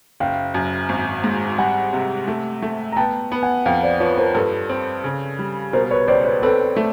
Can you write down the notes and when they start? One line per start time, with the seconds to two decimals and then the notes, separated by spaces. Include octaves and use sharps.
0.20 F#1 F5 G5
0.54 F#2
0.89 G#1
1.24 G#2
1.58 G3 F#5 G#5
1.93 C3
2.28 A3
2.62 A3
2.92 A#5
2.96 B3 G5 A5
3.32 B3
3.43 F#5 G#5
3.66 F2 F5 G5
3.83 C5 D5
4.00 F3 B4 C#5
4.18 A#4 C5
4.35 G2 A4 B4
4.69 C4
5.04 C#3
5.39 G3
5.73 B2 A#4 C5
5.91 B4 C#5
6.08 C#2 C5 D5
6.25 B4 C#5
6.42 C4 A4 B4
6.77 A3